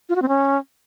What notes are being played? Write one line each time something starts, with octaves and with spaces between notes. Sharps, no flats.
F4
F#4
C4
C#4